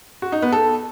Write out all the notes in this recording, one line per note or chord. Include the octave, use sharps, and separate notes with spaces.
F#4
D#4
B3
A4